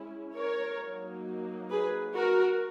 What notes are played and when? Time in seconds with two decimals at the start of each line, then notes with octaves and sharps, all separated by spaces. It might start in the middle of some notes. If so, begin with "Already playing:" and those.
Already playing: G#3 C#4 E4
0.35 A#4 C#5
0.80 F#3 A#3 D#4
1.70 G#4 B4
2.15 F#4 A#4